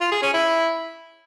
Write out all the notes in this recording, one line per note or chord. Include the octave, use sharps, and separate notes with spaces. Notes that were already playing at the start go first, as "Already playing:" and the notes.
F4
G#4
C#4
E4